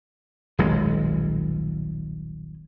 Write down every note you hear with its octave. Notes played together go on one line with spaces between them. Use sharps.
D#1 B1 G#3